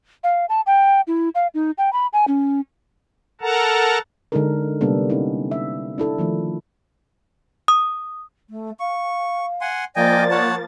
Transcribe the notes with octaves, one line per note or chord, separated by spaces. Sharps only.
F5
A5
G5
E4
F5
D#4
G5
B5
G#5
C#4
A4 A#4 F#5 A5 A#5
D3 G#3 D4 D#4 A4 A#4
C3 G3 A#3 B3 D4 A4
C#4 D#4 E4
E5
D4 E4 A4
D#3 F3 A3
D#6
A3
F5 C#6
F#5 G#5 C6
F3 A#3 D5 D#5 G5 G#5 A6
C#5 F#5 A5